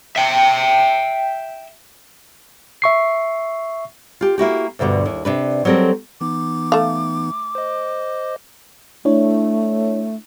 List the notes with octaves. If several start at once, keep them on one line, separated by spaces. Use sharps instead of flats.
E5 G5
E5 C#6 C7
F4 G4
A#3 E4 F#4 G4
D2 G2 B2 D3 F#4
D#2 E4
C3 D4 B4
F#3 G3 C4 A4 A#4
E3 B3 D#4 D6
A3 F5
C5 D#5
A3 D4 E4 C#5